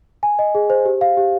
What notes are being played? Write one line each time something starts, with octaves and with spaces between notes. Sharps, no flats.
G#5
D#5
G#4
C5
G4
F5
G4